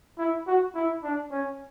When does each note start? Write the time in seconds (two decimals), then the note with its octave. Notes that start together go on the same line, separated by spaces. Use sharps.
0.18 E4
0.47 F#4
0.75 E4
1.03 D4
1.31 C#4